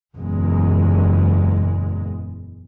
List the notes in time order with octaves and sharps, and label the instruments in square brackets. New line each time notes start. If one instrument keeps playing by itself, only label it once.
[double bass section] F#1 E2 A#2 G#3